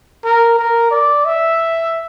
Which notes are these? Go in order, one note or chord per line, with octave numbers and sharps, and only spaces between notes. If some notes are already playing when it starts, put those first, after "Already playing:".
A#4
A#4
D5
E5